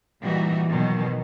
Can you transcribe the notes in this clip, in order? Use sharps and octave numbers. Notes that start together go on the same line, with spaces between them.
A#2 E3 G3 D#4 F#4
B2 D#3 F#3